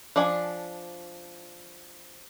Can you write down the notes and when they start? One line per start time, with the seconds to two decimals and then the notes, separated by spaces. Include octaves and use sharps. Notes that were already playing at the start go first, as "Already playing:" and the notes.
0.16 F3 D4 D5 G#5